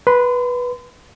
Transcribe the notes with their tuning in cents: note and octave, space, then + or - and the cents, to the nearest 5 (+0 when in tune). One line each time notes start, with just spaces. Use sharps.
B4 -10 C6 -35